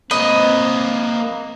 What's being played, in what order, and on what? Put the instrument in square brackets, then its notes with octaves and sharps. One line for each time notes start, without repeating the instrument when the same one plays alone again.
[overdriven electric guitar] A#3 B4 [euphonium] C4 [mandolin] D#5